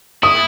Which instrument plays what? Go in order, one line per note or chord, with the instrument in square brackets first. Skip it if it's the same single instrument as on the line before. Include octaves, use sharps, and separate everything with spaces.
[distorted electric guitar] E4 [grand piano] D#6